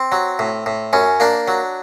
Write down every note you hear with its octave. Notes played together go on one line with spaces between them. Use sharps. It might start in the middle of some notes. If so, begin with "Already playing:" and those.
Already playing: C4
F#3
A2
A2
F#2 C#4
A#3 D4
F#3